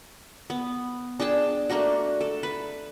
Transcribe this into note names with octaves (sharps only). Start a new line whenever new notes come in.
B3
D4 G#4 G5 A5
A3 A#3 D4 F#4
A4
B4